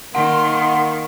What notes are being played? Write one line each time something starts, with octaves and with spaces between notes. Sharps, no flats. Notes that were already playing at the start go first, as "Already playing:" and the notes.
D#3 A#3 F#5 C6